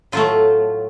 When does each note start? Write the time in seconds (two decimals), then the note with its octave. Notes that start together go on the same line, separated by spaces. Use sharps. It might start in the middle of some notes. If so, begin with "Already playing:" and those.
0.12 A2 F#3 A3 F4